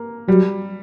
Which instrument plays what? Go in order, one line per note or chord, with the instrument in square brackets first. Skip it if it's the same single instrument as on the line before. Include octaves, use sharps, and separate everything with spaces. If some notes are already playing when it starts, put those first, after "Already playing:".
Already playing: [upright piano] A#3
[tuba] F#3 [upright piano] G3